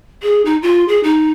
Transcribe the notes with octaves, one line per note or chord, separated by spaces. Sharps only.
G#4
D#4
F4
G#4
D#4